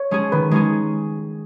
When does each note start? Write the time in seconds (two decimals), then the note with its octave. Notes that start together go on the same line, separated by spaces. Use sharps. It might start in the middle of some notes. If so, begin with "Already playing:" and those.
Already playing: C#5
0.11 G#3 C#4 G#4
0.32 D#3 B4
0.51 G#3 C#4 G#4